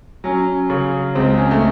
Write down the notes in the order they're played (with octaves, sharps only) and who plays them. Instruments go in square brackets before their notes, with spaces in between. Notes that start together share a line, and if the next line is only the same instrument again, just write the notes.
[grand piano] F#3 [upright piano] C#4
[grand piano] C#3
[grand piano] C#2 [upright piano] C4
[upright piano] C#4
A3